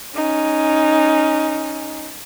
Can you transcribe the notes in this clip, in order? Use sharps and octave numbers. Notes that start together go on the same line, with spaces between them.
C#4 D#4